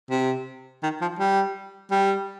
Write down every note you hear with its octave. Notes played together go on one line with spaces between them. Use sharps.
C3
D#3
F3
G3
G3